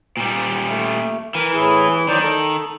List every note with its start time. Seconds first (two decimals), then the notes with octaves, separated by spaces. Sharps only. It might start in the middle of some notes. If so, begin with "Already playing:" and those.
0.17 A#2 G3
0.68 A3
1.35 E3 A#4
1.54 A2 E4 G#4
2.08 D#3 F#3 C5 D5
2.23 A4